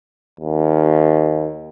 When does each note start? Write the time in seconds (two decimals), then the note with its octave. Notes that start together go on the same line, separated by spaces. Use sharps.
0.40 D#2